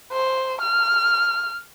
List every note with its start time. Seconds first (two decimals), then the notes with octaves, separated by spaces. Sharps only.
0.12 C5
0.61 F6